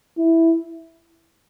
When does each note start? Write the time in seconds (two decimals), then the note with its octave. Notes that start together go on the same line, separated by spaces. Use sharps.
0.18 E4